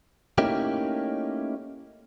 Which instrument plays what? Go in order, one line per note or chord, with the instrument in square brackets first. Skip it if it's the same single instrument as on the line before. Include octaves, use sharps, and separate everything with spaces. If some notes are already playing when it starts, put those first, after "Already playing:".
[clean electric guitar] A3 A#3 C#4 D#4 E4 G4